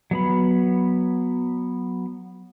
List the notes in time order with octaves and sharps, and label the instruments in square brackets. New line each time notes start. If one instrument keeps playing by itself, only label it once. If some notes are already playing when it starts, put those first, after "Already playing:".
[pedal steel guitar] F#3 B3 B5